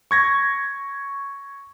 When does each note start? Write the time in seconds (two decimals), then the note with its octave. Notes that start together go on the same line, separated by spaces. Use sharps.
0.11 C#6 G#6 A#6